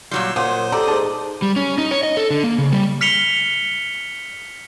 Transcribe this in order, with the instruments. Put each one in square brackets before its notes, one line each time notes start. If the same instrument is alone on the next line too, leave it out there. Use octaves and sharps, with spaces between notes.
[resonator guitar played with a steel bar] A#2 F#3 G3 [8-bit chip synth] C6 C#6 E6
[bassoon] F#2 [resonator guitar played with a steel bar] A#2 [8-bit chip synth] C5 D#6 [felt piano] F#5
[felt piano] G4 A4 A#5 [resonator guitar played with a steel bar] D5
[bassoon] G#2 [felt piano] A5
[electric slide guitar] G3
C#4
D#4
C#5
D#5
A4
D3
A#3
C#3
G3
[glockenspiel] F6 B6 C#7 F7 G7